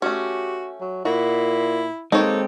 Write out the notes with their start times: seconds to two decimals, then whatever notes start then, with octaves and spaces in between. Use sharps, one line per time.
0.02 A3 C#4 F#4 G4
0.81 F#3
1.05 A#2 E4 F#4
2.12 G#3 A#3 C4 D#4 G4 A4 C#5